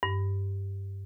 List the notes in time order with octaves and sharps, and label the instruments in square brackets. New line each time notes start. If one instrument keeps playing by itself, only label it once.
[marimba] G2